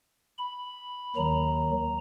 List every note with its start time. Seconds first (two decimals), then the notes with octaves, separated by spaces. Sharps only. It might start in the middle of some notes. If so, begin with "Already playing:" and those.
0.39 B5
1.16 D#2 D#3 F#3 A#5